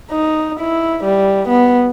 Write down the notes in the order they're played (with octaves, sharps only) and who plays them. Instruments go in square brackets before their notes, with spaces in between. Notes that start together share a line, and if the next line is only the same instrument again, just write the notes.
[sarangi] D#4
E4
G3
B3